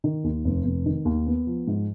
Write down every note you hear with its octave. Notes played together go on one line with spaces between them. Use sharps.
D#3
D#2
F1
F1
D#3
D#2
B3
F3
G#2